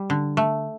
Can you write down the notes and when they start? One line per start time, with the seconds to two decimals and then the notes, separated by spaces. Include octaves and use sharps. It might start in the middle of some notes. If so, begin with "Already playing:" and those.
Already playing: G3
0.10 D3
0.37 A3